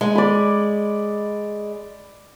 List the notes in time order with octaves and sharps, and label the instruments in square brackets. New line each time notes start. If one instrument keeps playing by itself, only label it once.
[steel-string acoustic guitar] G#3
[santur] D5 B5